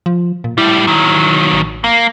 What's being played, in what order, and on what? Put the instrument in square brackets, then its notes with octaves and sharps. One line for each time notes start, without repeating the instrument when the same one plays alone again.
[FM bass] F3
A#2
[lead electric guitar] A2 G3 [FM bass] E4
[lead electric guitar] D#3 F#3
[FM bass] A1
[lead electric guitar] A#3